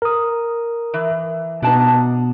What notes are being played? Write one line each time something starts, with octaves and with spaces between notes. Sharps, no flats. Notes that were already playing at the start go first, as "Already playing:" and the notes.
A#4 D#6
E3
B2 B3 D4 D#4 A5